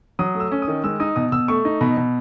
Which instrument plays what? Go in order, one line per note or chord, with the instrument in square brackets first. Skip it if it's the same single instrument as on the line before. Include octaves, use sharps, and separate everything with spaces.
[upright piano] F#3 D#6
A3
E6
C#4
D#6
D#3
G#3 E6
D#4 D#6
B2 D#6
B2 E6
A3 C#6
D#4
B2 B5
B2